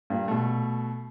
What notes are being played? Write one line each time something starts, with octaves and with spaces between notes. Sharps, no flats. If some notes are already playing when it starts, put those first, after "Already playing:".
G2 A#2
B2 A3